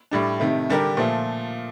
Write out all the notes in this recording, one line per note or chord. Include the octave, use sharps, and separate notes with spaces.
A2 G3 D4
C3 D#3 A3
D3 G3 D4 G4 A#4
A#2 F3 A3